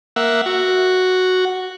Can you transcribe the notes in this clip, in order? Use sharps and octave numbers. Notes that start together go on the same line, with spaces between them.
A#3 E5 F#5
F#4